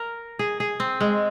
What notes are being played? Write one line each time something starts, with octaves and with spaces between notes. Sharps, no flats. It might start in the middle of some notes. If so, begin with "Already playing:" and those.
Already playing: A#4
G#4
G#4
C4
G#3